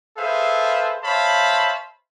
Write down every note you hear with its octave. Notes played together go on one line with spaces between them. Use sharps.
G#4 A4 B4 C5 E5 F5
C5 C#5 E5 F5 A5 B5